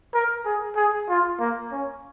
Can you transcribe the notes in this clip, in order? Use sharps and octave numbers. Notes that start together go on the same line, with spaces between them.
A#4
G#4
G#4
F4
A#3
C#4